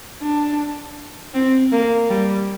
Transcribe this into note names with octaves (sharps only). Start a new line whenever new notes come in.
D4
C4
A#3
G3